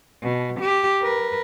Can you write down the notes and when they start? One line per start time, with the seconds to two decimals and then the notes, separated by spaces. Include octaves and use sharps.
0.23 B2
0.60 G4
1.02 A#4 B4